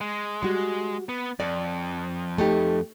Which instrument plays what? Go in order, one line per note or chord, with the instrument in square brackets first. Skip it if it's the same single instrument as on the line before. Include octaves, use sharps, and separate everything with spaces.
[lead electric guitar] G#3
[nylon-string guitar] G3 F#4 [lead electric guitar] G#3
[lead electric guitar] B3
[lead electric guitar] F2 [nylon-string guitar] D5
[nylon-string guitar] A3 D#4 G4